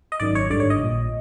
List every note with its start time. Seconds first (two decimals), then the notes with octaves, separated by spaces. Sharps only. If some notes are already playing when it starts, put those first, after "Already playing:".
0.12 D#5
0.20 G#1 F#2 D#3 D5
0.35 C#5
0.50 G#1 G2 D3 D5
0.60 C#5
0.70 D#5
0.80 A#1 A#2